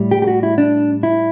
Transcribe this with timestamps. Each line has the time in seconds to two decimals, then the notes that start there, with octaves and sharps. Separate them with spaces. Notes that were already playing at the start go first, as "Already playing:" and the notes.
Already playing: A2 G3
0.11 G4
0.22 G4
0.27 F#4
0.43 E4
0.58 D4
1.03 E4